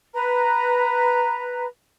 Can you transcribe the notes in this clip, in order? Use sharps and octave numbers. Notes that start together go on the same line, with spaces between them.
B4 A#5